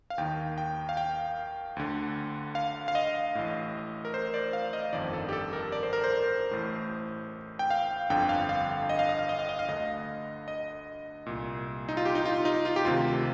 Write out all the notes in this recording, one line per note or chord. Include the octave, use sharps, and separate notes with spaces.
F5
D#2 D#3 G5
G5
F5
G5
D2 D3
F5
F5
D#5
A1 A2
A#4
C5
D5
F5
D#5
G1 F2 D#3 D5
A4
G4
A4
A#4
D5
C5
A#4
C5
A1 A2
G5
F5
G1 F2 D3 G5
F5
F5
D#5
F5
D#5
F5
D#5
F5
D#5
F5
D2 D3 D#5
D#5
C2 A#2
D#4
F4
G4
D#4
F4
D#4
F4
G4
D2 C3 D#3 F4